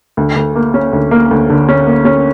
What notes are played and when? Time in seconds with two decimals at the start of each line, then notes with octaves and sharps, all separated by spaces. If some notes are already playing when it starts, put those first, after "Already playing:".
0.17 D2
0.36 D2
0.55 A#3
0.74 C#4
0.93 D2
1.11 A#3
1.31 D2
1.50 D3
1.69 C#4
1.86 A#3
2.05 C#4